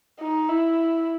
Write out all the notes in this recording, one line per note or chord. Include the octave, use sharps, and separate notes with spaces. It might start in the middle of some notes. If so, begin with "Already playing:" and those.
D#4
E4